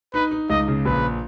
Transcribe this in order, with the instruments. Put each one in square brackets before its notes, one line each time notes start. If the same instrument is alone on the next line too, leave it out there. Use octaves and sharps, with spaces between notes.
[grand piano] D#4 [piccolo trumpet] B4
[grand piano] D#4
[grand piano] C#2 [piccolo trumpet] D#5
[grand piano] C#3
[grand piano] A#1 [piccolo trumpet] B4